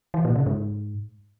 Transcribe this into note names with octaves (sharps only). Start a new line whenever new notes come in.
E3
A#2
C#3
G#2